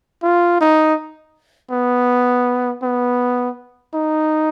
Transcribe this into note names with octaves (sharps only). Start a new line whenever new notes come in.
F4
D#4
B3
B3
D#4